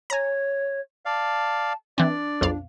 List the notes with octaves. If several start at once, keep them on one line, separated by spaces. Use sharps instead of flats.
C#5 G#5 A#5
D5 F5 A5
E3 C4 D4 D5
B1 F2 F5